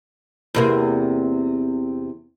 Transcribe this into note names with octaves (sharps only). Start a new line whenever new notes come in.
E2 C3 A#3